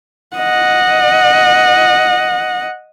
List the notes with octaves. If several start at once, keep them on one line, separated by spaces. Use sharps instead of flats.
D#5 F#5